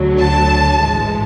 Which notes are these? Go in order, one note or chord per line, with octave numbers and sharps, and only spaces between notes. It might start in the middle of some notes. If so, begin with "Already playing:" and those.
Already playing: D2 D3 F#3
A5
A1 G#2 E3 G#3